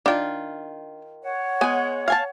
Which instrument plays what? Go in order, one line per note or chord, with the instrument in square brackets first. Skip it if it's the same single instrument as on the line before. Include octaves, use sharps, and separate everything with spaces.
[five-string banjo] D#3 F4 [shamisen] D4 G5
[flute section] C#5 F#5
[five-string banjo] G#3 G#5 [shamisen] B3
[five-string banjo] F5 G#5 A5